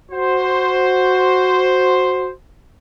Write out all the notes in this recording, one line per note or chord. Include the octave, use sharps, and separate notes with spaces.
F#4 C5